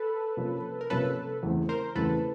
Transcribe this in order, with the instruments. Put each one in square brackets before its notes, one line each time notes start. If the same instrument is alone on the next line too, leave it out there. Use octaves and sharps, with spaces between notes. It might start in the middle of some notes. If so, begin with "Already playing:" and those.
Already playing: [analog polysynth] A4 B4
[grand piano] C3 F3 A#3 C#4
[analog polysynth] A#4
[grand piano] C3 F3 A#3 C#4 [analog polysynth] A4 B4
[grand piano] E2 C#3 E3 A3 C4
[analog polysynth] A#4 C5
[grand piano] E2 C#3 E3 A3 C4 [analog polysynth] A4 B4